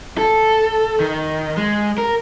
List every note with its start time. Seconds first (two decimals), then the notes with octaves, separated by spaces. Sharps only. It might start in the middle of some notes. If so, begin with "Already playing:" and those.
0.18 A4
1.00 D#3
1.57 G#3
1.98 A#4